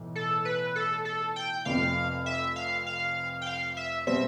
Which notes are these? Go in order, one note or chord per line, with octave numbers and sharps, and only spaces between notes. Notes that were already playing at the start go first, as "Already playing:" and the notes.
Already playing: B1 A2 E3
A4
B4
A4
A4
G5
F1 F2 C3 F5
E5
F5
F5
G5
F5
E5
B2 G3 C4 E5